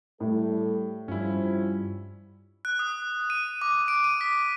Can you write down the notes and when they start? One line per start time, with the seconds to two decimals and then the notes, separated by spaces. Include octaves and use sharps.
0.20 A2 G3 A4
1.08 G2 F3 G3 C#4 E4 F4
2.65 F#6
2.79 D#6
3.30 D#7
3.62 D6
3.88 D7
4.04 D#7
4.21 B6